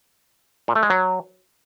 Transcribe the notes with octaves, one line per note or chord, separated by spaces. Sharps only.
A#2
A3
G#3
F#3